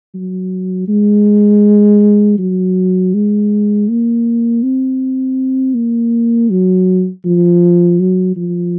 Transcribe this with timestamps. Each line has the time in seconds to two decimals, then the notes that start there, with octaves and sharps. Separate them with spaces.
0.14 F#3
0.88 G#3
2.38 F#3
3.14 G#3
3.89 A#3
4.63 C4
5.75 A#3
6.50 F#3
7.25 F3
8.00 F#3
8.36 F3